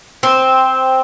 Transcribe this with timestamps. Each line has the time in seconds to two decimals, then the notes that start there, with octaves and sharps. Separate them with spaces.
0.23 C4